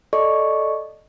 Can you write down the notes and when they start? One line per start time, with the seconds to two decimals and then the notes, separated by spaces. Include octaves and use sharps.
0.13 A4 D5 D#5 C#6